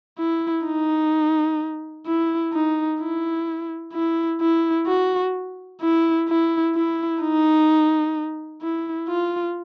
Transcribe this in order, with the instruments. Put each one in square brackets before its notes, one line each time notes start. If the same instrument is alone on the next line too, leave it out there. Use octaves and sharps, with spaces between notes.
[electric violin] E4
D#4
E4
D#4
E4
E4
E4
F#4
E4
E4
E4
D#4
E4
F4